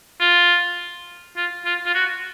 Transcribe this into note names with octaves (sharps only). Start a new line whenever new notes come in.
F4
F4
F4
F4
F#4